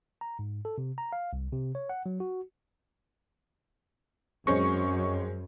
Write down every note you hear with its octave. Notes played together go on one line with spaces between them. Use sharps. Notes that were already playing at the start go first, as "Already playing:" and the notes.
A#5
G#2
A4
C3
A#5
F5
C2
C3
C#5
F#5
F#3
F#4
F#2 G#3 C4 C#4 C#6